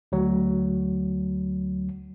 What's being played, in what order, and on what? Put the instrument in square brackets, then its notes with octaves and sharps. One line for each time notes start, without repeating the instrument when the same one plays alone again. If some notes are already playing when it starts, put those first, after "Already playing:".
[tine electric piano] D2 F#3